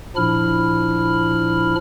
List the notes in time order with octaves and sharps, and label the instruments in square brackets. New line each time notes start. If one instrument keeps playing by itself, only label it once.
[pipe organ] A#2 F3 D4 E4 B5 F6